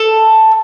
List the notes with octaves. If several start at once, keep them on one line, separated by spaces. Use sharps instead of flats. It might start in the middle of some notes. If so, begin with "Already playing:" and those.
Already playing: A4